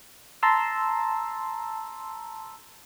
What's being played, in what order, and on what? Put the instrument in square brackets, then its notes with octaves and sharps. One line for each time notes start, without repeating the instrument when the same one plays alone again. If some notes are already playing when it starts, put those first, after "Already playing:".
[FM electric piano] A5 A#5 C6 E6